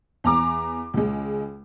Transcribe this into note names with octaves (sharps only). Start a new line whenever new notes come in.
E2 A#5 D6
C#2 G#3